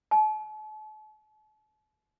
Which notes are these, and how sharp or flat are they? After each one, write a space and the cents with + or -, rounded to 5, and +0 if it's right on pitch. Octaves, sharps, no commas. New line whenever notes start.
A5 -45